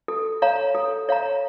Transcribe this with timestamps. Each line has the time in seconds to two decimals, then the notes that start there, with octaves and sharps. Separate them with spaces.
0.08 A4
0.42 C#5 F5 A#5
0.75 A4
1.09 C#5 F5 A#5